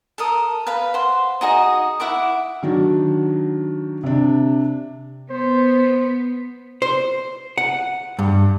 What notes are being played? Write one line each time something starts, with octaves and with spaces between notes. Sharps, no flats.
A4 A#4 D#6
B4 F5 B5
C5 F#5 C6
D#4 F#4 G#4 D#5
E4 F#5 C#6 D6
D#3 F#3 D4
C3 D4
B3 C5
C5
F#5
G2